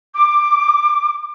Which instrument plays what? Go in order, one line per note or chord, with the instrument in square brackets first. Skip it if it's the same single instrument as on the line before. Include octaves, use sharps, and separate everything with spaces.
[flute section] D6